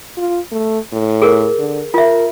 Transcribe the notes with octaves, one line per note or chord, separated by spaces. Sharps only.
F4
A3
A2
G#4 A#4
D3
F4 A#4 E5